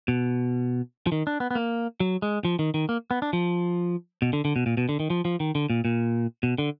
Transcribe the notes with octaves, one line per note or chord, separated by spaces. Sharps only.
B2
F3
D#3
D4
B3
B3
A#3
F#3
G#3
F3
D#3
D#3
A#3
B3
D4
F3
B2
D3
D3
B2
A#2
B2
D3
D#3
F3
F3
D#3
D3
A#2
A#2
B2
D3